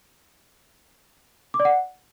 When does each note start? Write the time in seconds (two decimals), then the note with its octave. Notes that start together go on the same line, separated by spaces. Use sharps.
1.54 D6
1.60 D5
1.65 F#5